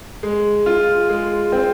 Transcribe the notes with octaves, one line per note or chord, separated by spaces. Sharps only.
G#3
F4
G#3
C4